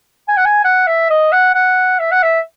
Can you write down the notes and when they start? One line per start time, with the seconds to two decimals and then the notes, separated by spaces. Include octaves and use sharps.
0.28 G#5
0.37 F#5
0.45 G#5
0.64 F#5
0.87 E5
1.10 D#5
1.32 F#5
1.54 F#5
1.99 E5
2.11 F#5
2.23 E5